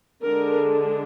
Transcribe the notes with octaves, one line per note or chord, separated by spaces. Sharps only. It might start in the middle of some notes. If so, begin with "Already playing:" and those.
D3 G#3 D4 A#4